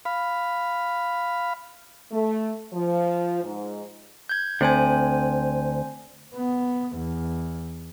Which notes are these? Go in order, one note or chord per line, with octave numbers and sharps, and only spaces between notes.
F5 B5
A3
F3
G#2
G6 G#6
D2 C4 C5 G#5
B3
E2